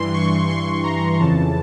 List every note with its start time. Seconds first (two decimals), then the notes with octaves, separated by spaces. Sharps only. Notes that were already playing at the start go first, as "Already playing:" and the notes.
Already playing: G2 E3 C6
0.14 C#6
0.49 C6
0.84 A#5
1.20 F2 C#3 E3 A5